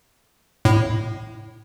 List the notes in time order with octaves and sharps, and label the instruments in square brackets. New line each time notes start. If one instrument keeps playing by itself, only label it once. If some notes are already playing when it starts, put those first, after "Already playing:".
[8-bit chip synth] A2